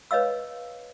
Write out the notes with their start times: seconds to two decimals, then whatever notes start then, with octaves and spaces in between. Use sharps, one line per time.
0.11 B4 C#5 D#5 F5 E6